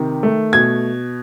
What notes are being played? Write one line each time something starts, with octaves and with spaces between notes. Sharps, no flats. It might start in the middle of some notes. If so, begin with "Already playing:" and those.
Already playing: C3 D#3
A3
B2 G#6